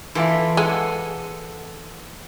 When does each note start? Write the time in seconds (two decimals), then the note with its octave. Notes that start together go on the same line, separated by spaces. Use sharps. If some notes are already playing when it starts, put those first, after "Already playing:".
0.15 E3 E4 F4 A4 D5
0.57 G#3 A4 F#5 G#5